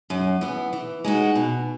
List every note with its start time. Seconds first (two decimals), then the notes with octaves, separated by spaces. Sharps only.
0.10 F#2
0.41 E3 B3
0.73 E3
1.04 G#3 D#4 F#4
1.35 B2